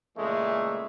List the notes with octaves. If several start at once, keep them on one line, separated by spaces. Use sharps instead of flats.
A#2 C#3 E3 G#3 A3